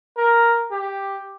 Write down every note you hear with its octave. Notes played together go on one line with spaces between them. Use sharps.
A#4
G4